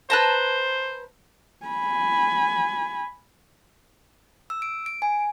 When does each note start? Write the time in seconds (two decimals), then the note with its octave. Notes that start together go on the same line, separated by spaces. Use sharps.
0.10 B4 C5 A5 A#5
1.66 G#5 B5
4.50 E6
4.62 D7
4.86 D7
5.02 G#5